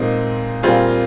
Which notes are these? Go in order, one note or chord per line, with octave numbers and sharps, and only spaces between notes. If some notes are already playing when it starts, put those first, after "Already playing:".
Already playing: A#2 G#3 C4 D#4
A#2 G3 C4 F4 G#4